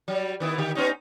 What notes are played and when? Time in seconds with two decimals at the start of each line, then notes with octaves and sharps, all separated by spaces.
0.08 F#3 G3
0.40 D#3 B3 E4
0.58 D3 D#3 G4
0.75 B3 C#4 D#4